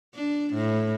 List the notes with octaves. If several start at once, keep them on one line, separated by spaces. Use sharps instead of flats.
D4
A2